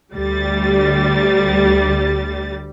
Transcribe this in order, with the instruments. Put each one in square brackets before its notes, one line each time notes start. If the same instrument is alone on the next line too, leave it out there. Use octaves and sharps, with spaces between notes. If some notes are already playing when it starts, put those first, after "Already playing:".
[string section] D2 G3 A6